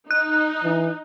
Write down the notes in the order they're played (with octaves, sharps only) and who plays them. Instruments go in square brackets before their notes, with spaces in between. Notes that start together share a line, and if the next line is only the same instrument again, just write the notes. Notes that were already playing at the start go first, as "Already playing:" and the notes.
[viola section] D#4 [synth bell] F#6
[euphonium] E3